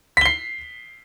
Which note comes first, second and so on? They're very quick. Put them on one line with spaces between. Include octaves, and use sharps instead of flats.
B6 G7 C7